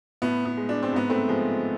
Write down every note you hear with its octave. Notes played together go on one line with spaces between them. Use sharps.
A2 B3
B3
G#3
D4
C4
G#2 B3
A3 C4
F3 G#3